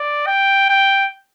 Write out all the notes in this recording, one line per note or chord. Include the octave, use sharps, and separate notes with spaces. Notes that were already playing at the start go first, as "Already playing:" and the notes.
Already playing: D5
G5
G5